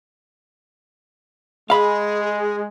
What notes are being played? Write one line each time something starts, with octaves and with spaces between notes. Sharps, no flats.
G#3 G#4 F5 B5